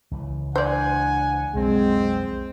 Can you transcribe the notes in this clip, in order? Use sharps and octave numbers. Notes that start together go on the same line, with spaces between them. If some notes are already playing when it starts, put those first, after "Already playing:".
C#2 C#3 E3
D4 C5 D5 F#5 G#5
B1 F2 G#3 C4